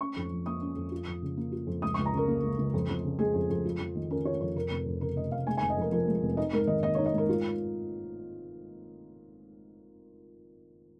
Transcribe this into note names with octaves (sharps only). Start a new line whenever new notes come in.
C#4 C#6
F2
F3
A#3 D#6
C#4
F2
F4
F2
C#3
A#3
F4
F2
C#2 D#6
C#6
C#2
A#5
C#3 A#4
A#3
C#2
C#2
F2
F2
C#3
G#3 G#4
F2
F2
F4
F2
D#3
C#4 A#4
F4 C#5
F2 C#5
F1 A#4
F1
F2
C#3 A#4
F1 D#5
F1 F5
G#3 G#5
G#5
F1
D#5
F2 A#4
F3 A#4
G#3
F1
D#4 D#5
G#2 A#4
D#3 D#5
A#3 D#5
C#5
D#4
D#5
G#2 A#4
F4